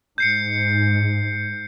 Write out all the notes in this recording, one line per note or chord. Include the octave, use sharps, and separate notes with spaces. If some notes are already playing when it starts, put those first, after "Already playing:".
G#2 G6 C7 C#7